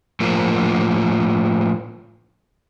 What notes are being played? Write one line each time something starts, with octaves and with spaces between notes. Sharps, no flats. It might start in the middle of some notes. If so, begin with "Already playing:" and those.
A2 F3 A#3